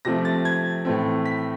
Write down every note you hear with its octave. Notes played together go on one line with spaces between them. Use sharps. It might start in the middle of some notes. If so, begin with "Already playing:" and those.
C3 F3 A3 C4 A#6
A6
G#6
A2 E3 A3 C4
B6